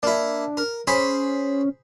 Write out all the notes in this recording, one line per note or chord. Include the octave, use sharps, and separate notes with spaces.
A#3 D4 E4
A#4
C#4 G#4 C5 B5